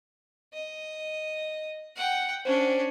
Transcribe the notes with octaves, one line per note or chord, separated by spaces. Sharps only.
D#5
F#5 G5
C#4 D4 C5